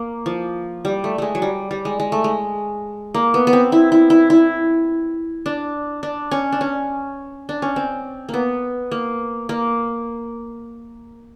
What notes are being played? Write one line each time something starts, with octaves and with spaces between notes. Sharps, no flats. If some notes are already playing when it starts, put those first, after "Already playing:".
Already playing: A#3
F3
G3
A3
G#3 A3
F#3
G3
G3
G#3
G#3
A3
G#3
A#3
B3
B3
C4
E4
E4
E4
E4
D4
D4
C#4
D4
C#4
D4
C#4
C4
A#3 B3
A#3
A#3